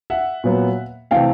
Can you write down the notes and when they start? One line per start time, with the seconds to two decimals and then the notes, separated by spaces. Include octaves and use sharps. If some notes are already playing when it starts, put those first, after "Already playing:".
0.10 E5 F#5
0.44 A#2 F#3 B3
1.11 C3 E3 A3 C4 F5 G5